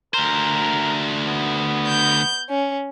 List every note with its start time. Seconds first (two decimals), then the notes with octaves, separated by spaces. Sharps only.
0.14 D2 A#4 C5
1.27 B3
1.87 G6
2.49 C#4